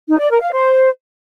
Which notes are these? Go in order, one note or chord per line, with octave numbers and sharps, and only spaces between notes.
D#4
D5
A#4
F5
C5